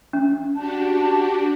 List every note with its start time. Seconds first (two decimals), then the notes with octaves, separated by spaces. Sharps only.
0.13 C#4
0.56 D4 F#4 G4 A5